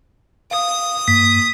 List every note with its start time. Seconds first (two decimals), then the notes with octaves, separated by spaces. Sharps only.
0.51 F5 D#6
1.08 G2 A#3 B6